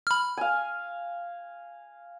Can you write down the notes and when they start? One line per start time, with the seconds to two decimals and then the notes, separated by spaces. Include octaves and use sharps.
0.07 B5 F6
0.37 F5 G#5